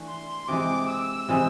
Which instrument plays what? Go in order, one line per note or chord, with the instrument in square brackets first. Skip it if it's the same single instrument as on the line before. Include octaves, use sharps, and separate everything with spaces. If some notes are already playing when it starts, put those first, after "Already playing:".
Already playing: [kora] E3 A3 D4
[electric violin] C6
[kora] C3 E3 G#3 [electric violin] D6
[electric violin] E6
[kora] C3 E3 G#3